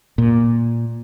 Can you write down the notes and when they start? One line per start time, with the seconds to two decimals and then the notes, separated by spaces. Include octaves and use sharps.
0.18 A#2